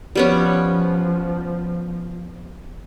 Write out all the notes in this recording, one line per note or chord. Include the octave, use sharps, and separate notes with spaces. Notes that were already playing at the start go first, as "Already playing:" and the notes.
F3 G3 B3 C#4